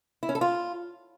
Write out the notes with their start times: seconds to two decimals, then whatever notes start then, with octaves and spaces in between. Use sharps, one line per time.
0.23 E4
0.29 C#4
0.35 A4
0.41 F4